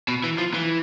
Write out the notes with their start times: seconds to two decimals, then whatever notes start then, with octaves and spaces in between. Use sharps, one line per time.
0.08 B2
0.24 E3
0.38 F3
0.54 E3